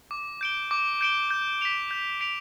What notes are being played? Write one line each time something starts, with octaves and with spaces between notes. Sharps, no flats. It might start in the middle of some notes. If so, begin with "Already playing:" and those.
D6
G6 D7 G7
D6
G6 D7 G7
G6
B6 D7 F7
G6
B6 D7 F7